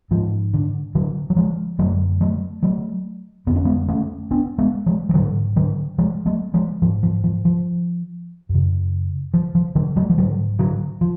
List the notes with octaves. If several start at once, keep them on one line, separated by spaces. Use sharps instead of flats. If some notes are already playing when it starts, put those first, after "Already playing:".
G#2 F3
D3
D3 F#3
F#3
F3 G#3
F#2 D3 F#3 A3
F#3 A3
F#3 A3
F2 D3 B3
C#4
G#3 B3
A3 C#4
B3 D4
G#3 B3
F3 G#3
F3
G#2 D3 F#3
D3 F#3
F3 G#3
F#3 A3
F3 G#3
G#2 F3
F3
F3
F3
F#2
C#3
F3
F3
D3 F#3
F#3 A3
F3
G#2 D3 F#3
D3 F#3
F3